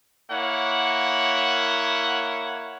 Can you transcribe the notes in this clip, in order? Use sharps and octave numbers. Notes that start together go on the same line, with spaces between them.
A#3 E4 C#5 F#5